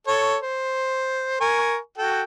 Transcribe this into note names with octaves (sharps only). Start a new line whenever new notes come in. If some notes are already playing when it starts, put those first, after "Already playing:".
A4 C#5
C5
A#4 G#5 C#6
F#4 A4 G5